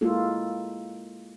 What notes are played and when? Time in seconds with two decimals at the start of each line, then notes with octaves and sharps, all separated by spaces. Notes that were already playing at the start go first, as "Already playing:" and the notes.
0.01 G#3 A#3 E4 F4 A4